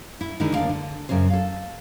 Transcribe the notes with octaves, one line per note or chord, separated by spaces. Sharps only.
E4
D3 D#3 G#3 D#4 E4
D#2 B2 D4 F5
D3
F#2 C#3 C#4 C5
A4 F5